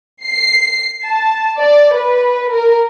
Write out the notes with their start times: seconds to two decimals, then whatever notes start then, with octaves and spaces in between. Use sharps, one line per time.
0.24 C7
1.07 A5
1.60 D5
1.95 B4
2.51 A#4